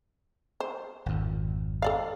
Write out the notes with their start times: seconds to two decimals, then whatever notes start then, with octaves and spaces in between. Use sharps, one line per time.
0.60 C5
1.06 G#1 F2
1.82 A4 D5 F5